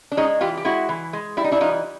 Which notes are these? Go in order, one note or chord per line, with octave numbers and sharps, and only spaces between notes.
D4
G#3 C#4 D#4
E3 F4 G4
G4
G#3 E4 F#4
E3
G#3
G3 E4
D#4
D4 E4
E3 D#4 F4